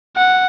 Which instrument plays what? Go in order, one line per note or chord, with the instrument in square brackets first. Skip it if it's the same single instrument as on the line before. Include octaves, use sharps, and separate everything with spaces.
[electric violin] F#5